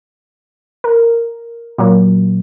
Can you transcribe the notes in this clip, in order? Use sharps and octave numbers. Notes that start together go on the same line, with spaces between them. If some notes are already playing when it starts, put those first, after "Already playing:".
A#4
A#2 F#3 A#3